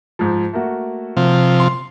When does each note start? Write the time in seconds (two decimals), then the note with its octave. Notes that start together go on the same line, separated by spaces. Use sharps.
0.19 G#2 F3
0.53 A3 A#3 F#4
1.17 C3 F3
1.60 C6